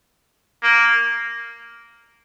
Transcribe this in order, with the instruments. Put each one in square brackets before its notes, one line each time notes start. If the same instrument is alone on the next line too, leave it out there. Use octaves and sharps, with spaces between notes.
[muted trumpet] A#3